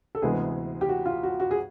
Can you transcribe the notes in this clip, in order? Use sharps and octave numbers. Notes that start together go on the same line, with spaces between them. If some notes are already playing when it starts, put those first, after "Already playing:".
A4
D2 C3 E3 G#3 B3 G#4
G4
F#4
F4
F#4
F#4
G#4